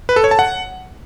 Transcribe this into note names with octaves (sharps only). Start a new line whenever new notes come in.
B4
A4
C#5
A5
F#5